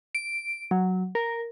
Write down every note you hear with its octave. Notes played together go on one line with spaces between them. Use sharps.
D7
F#3
A#4